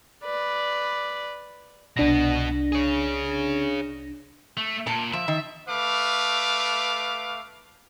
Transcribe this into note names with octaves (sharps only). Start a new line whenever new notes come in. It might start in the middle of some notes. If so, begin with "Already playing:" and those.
B4 D5
C2 B2 B3 D4 A#6
G#4 C#5
A3
A#2 A5
F3 E5
D#3
A3 B4 F5 D6